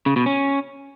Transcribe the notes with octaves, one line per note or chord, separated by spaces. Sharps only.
C#3
B2
C#4